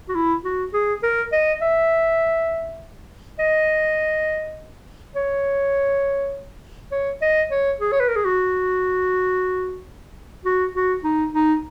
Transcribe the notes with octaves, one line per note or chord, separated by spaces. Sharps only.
F#4
E4
F#4
G#4
A#4
D#5
E5
D#5
C#5
C#5
D#5
C#5
G#4
C#5
B4
A#4
G#4
F#4
F#4
F#4
D#4
D#4